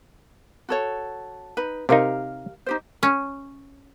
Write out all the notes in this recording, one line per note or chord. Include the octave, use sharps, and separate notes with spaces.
F#4 A4 C#5
D#4 B4
C3 D#4 G4 A#4 F5
D#4 G4 C5
C#4